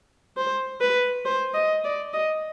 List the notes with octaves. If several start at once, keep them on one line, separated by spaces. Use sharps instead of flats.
C5
B4
C5
D#5
D5
D#5